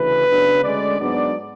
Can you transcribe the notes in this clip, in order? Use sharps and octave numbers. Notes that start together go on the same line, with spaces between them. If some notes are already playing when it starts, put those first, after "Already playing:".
Already playing: D2 C#3 E3 B4
C#3 F#3 B3 D4
D2 D3 G#3 C#4 D5
G#2 F#3 B3 D4 D5